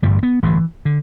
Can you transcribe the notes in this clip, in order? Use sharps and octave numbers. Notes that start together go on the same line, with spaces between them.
A1 G2 D3 G3
B3
A1 G2 D3 E3
D3